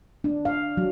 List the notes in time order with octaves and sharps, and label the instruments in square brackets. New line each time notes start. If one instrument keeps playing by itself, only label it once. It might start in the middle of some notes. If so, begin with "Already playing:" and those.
[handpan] D4
F5
F#3